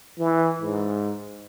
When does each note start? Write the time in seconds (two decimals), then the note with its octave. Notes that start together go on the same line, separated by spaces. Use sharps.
0.19 E3
0.61 G#2